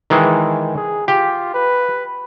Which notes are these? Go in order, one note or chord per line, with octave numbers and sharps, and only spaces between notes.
D#3 E3 G#3
G#4
F4 G4
B4